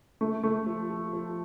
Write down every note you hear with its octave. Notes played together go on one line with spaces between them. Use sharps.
A3
A3
F3
F3
F3